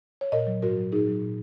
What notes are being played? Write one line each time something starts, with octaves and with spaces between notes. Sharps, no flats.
C#5
A#2 A#4 D#5
F#3
G#2 F#4 A#4
F#3
A#2 D#4 G#4
F#3
A#2